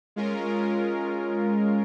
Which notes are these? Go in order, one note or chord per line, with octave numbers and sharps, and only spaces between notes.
G#3 C#4 F4 A#4